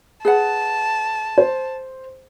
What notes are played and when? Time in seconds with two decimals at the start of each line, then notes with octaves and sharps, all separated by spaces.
0.25 G#4 B4 F#5 A5
1.38 C5